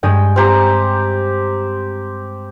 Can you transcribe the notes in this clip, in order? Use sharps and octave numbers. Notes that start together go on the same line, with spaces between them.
G2 G#3 G5 D#6
C4 G4 A#5